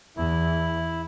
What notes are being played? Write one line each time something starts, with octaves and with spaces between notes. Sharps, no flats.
E2 E4